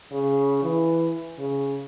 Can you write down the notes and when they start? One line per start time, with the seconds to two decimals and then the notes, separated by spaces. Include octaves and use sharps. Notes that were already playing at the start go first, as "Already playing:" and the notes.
0.12 C#3
0.63 E3
1.39 C#3